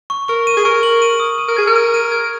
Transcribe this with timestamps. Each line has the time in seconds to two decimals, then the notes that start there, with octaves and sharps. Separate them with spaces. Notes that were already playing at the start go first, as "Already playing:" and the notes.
0.10 C#6
0.28 A#4 C#6
0.47 D#7
0.57 G#4
0.65 A#4 C#6
0.83 F#7
1.02 D#7
1.20 D#6
1.38 D#7
1.48 A#4
1.57 G#4 G#6
1.67 A#4
1.75 D#7
1.94 D#7
2.12 G#6